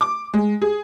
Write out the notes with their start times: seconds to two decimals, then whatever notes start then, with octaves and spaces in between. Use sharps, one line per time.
0.01 D6
0.34 G#3
0.62 G#4